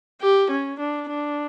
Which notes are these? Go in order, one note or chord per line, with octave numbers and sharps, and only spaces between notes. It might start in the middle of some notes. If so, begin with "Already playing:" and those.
G4
C#4
D4
D4